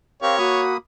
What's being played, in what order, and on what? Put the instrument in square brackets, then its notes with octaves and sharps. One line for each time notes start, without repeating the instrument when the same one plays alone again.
[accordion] C4 G4 A#4 [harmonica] C#5 [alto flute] F5
[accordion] A#3 B5 D#6 [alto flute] F#4